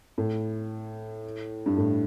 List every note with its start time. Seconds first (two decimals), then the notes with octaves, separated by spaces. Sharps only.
0.18 A2
1.66 G2
1.77 A2